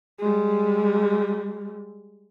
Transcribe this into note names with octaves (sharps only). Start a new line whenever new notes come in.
G3 G#3